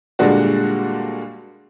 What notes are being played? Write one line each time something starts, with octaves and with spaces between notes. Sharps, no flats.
A#2 D3 G3 G#3 F#4